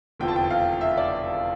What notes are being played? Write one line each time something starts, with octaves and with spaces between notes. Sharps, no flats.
F1 E2 D3 F3 G5
A5
G5
F5
E5
D5